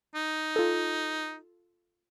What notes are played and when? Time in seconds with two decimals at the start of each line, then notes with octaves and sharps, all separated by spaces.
0.15 D#4
0.56 F4 A4